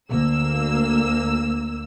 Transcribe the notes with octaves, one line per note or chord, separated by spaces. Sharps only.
D2 A#3 E6